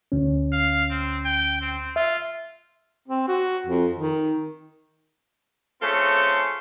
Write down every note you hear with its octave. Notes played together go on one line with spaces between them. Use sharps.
D2 C#4
F5
C4
G5
C4
F4 E5
C4
F#4
F2
D#3
A3 C4 C#4 F4 G#4 A4